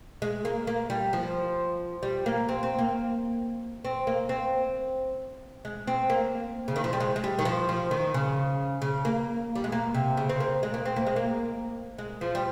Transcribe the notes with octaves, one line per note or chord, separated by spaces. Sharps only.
G#3
A#3
A#3
G3
F3
G3
A#3
C4
C4
A#3
C4
A#3
C4
G#3
C4
A#3
C#3
D#3
F3
G3
G#3
G#3
G3
D#3
F3
F3
D#3
C#3
C#3
A#3
G3
G#3
A#3
C3
C#3
C4
A#3
G#3
A#3
C4
A#3
G#3
A#3
G#3
F3
G3